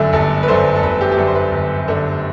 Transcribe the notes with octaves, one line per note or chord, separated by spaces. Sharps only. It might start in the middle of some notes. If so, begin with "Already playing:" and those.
Already playing: G1 F#2 D3 A3 D5 E5
G1 A4
B4
F#2 D3 A3 C5
A4
G1 B4
G4
G4
F#2 D3 A3 A4
C5
B4
G1
F#2 D3 A3